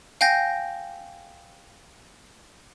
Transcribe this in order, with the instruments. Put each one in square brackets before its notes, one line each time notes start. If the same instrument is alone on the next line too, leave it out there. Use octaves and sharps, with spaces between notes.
[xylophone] F5 G5 G#5 G6 A#6